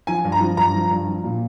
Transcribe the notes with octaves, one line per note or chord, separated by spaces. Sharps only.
F3 G#5
G2
A#5
F3
G2 A#5
F3
G2
F3
A#2